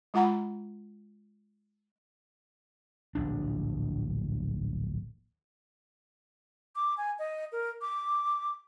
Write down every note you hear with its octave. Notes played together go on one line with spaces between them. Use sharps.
G#3 F4 F#5 A#5 B5
D1 A#1 D4
D6
G#5
D#5
A#4
D6